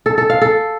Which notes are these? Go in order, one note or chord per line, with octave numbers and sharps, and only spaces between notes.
A4
A4
F5
A4